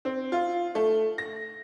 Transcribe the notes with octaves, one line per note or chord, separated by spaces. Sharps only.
C4
F4
A3
A#6